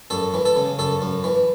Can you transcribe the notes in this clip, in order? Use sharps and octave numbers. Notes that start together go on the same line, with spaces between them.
F#2 A4
E3
A4
C#3
F#2 A4
F#2
E3